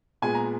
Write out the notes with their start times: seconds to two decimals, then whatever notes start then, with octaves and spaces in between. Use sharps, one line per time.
0.22 A#2 G#3 B3 G#5
0.35 A#5